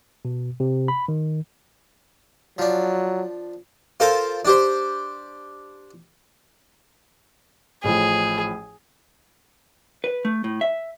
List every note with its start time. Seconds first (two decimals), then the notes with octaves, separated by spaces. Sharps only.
0.25 B2
0.60 C3
0.88 B5
1.08 D#3
2.58 F3 F#3 D4
4.00 F4 A4 A#4 C5 A5
4.45 D4 G4 C5
7.84 A1 A2 F3 G#4
10.04 B4
10.25 A3
10.44 A2
10.61 E5